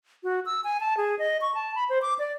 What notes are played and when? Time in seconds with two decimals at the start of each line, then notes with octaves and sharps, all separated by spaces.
0.23 F#4
0.46 E6
0.64 G#5
0.80 A5
0.97 G#4
1.19 D#5
1.41 C#6
1.55 A5
1.75 B5
1.89 C5
2.02 D6
2.19 D5